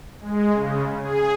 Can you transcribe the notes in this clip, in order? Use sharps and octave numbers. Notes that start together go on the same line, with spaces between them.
G#3
C#3
G#4